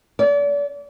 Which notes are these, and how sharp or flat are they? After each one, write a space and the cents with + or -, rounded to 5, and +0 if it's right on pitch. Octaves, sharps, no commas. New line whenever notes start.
D5 -35